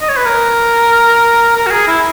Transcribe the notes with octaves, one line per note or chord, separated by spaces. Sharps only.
D#5
C#5
B4
A#4
A#4
F#4
G#4
E4